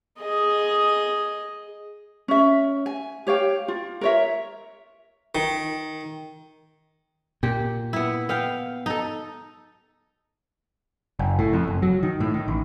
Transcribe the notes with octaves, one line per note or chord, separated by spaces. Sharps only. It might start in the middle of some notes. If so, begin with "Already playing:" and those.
G#4 D#5
C#4 E5
G#5
G4 C#5 F5 G5
F4
A#4 C#5 E5
D#3
A#2 G4
B3 E4
B3 F5 G5
D#4 A4
F#1
A2
F2
F#1
F#3
D#3
A2
D#3
A1